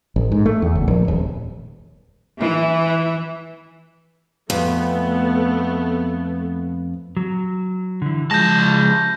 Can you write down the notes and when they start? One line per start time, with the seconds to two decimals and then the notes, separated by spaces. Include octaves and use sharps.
0.16 A1
0.32 G#2
0.46 A3
0.62 E2
0.75 F#1
0.88 A#1
1.08 D#1
2.40 E3
4.50 F2 A3 B3
7.17 F#3
8.02 D3 E3
8.31 C#2 F3 G#3 A5 G6 A#6